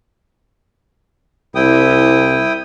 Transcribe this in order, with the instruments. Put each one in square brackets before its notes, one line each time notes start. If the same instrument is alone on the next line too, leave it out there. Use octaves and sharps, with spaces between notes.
[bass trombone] C2 [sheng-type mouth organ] E4 G5 D#6